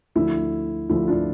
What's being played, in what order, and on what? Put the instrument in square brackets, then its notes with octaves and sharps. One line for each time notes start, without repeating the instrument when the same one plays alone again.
[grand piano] D2 D3 F3 E4
D2 D3 F3 E4
D4 F4